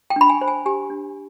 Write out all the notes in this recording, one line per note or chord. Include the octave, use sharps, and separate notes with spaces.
G5
D4 B5
G#5
C5
G#5
G4 G#5
D4